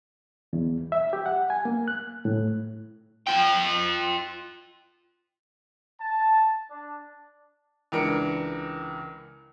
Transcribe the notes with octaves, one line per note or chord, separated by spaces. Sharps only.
E2
E5
G4
F#5
G#5
A#3
F#6
A2
F4 G5
A5
D4
C#2 E3 D4 A#4 C#7 D7